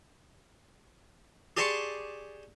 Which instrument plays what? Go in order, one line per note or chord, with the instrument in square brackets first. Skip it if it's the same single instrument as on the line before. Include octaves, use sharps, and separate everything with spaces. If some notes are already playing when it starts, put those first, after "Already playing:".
[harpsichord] G4 G#4 D5 A5 C6 C#6